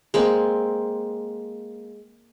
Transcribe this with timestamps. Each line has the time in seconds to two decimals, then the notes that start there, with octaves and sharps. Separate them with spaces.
0.14 G#3 A#3 C4